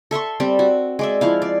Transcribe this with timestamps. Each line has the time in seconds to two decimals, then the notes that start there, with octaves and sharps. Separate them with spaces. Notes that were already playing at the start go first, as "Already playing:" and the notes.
0.11 A4 E5 C6 C#6
0.40 G3 C4
0.59 F#4
0.99 G#3 D5 E5
1.21 F3 E4 F5
1.42 D5